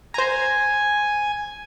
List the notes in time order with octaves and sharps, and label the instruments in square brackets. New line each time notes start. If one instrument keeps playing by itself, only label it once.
[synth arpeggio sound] C5 A#5 [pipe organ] G#5